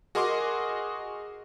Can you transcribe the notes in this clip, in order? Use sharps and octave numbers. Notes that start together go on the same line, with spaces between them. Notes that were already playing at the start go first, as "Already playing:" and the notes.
F#4 G#4 A#4 D#5 C6 D6